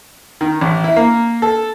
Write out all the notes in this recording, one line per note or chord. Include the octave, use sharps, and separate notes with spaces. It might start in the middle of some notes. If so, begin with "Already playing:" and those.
D#3
A1
E4
A#3
A4